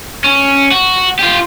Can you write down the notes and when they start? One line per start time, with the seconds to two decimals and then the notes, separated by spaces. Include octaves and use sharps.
0.24 C#4
0.72 F#4
1.19 F4 G4